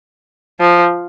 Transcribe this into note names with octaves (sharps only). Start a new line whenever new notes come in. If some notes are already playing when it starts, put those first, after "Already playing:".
F3